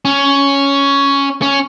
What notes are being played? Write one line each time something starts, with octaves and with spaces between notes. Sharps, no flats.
C#4
C#4